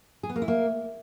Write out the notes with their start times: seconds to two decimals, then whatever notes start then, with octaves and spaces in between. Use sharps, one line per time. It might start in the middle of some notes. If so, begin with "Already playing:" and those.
0.23 G#4
0.30 B3
0.36 A#3
0.42 E4
0.48 A#3